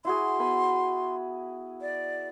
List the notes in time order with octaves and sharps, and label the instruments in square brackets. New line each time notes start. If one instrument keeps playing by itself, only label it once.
[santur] E4 F#4 G#4 [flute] C6
[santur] B3 G#5 B5
[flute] D5